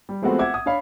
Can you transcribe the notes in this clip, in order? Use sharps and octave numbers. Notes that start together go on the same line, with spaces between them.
G3
F3 G#3 A3 B3 C4 F#4
E5 F#5 D6 G#6
D#6
D4 C#5 F5 B5